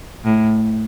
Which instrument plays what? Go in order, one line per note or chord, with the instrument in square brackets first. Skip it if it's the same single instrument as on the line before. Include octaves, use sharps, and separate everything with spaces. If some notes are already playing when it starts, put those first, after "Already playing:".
[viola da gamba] A2